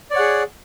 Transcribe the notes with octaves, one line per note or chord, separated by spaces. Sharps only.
G#4 C#5 D5 F#5